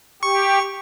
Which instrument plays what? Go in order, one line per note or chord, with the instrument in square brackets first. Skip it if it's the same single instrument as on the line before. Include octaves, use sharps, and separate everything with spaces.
[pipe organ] G4 [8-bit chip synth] C#6